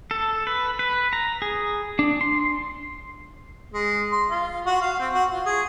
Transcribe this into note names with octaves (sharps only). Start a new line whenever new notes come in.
A4
B4
B4
A#5
G#4
D4
C6
G#3
C6
F4
F#4
F5
C4
F#4
F4
G#4